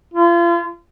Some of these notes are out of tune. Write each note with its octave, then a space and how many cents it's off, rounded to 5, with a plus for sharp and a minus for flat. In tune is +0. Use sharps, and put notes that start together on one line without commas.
F4 -35